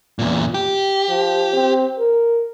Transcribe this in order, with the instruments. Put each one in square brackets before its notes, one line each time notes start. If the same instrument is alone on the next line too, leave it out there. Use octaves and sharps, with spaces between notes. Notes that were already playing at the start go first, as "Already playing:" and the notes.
[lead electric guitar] E2 A#2
G4
[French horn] F3
C4
A#4